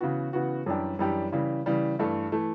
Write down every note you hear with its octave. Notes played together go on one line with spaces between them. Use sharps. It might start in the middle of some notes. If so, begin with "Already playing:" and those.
C#3 E3 B3 F#4
C#3 E3 B3 F#4
F#2 E3 G3 D4 G4
F#2 E3 G3 D4 G4
C#3 E3 G3
C#3 E3 G3
G2 E3 A3
E3 A3